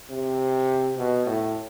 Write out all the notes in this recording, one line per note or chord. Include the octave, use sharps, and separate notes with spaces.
C3
B2
A2